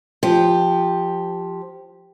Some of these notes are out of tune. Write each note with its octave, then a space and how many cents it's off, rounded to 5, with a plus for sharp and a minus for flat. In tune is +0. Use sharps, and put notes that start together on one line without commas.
F3 +0 G4 +0